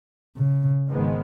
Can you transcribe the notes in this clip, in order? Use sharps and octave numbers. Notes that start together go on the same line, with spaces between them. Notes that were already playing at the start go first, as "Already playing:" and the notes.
C#3
G#1 G#2 D#3 G#3 B3